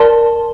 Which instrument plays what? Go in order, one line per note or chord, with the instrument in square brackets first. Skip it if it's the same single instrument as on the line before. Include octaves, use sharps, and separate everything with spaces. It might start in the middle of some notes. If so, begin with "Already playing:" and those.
Already playing: [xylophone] A#4 D5 A5 C6